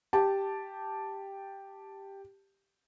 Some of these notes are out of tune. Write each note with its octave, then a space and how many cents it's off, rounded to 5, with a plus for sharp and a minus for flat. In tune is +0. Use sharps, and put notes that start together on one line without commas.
G4 +0 A5 +0